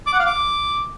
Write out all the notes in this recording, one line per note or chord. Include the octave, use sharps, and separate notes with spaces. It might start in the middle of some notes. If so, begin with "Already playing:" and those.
D6
F#5
F5
D6